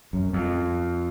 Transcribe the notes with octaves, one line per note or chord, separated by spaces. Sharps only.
F#2
F2